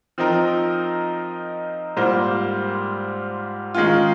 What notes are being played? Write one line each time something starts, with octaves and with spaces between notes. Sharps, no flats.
F3 C4 D#4 A#4
G#2 G3 A#3 F4 C5
D#3 G#3 C#4 F4